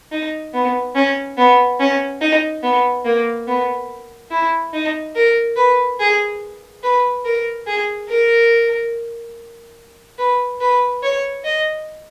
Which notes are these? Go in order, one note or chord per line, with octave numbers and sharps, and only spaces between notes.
D#4
B3
C#4
B3
C#4
D#4
B3
A#3
B3
E4
D#4
A#4
B4
G#4
B4
A#4
G#4
A#4
B4
B4
C#5
D#5